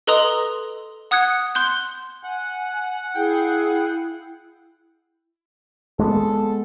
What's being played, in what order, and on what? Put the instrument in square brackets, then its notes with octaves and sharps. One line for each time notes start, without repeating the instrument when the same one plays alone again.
[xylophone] A4 B4 D#5 A#5 C6 D#6
F#5 D#6 F#6 G#6 C#7
C6 F#6 G6
[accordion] F#5 F#6 [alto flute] G#5
[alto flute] E4 [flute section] G#4 F5 [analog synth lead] G5
[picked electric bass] G#3 A#3 B3 [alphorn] A4